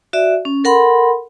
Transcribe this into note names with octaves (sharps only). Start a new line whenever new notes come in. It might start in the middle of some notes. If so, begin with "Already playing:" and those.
F#4 D5 E5
C#4
A4 A#4 F#5 B5 C6